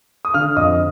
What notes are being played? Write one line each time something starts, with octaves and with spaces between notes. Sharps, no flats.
D#6
D3 F5 F6
F2 D#5 D#6